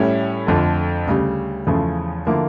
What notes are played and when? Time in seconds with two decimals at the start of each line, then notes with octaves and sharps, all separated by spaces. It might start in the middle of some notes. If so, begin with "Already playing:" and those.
Already playing: A2 G3 C#4 E4
0.47 F2 D3 F3 A3
1.07 D2 C#3 G3
1.67 E2 C#3 F3 A3
2.27 D3 F3 A#3 E4